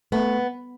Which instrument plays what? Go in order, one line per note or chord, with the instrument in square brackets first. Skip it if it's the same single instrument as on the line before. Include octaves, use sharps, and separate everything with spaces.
[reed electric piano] A3 [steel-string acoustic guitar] B3